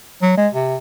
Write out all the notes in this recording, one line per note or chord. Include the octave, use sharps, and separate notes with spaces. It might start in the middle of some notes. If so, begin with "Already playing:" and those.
F#3
G#3
C3